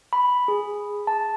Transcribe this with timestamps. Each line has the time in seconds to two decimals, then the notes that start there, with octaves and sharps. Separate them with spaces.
0.13 B5
0.48 G#4
1.07 A5